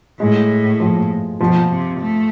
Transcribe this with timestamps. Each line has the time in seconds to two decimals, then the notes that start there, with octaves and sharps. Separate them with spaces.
0.20 A2 G#3
0.80 F3
1.40 B2 F3
1.70 C3
2.00 A3